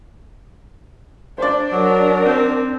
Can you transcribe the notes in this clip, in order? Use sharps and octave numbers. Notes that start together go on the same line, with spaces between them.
D4 C5 D5
F#3 A#4
C4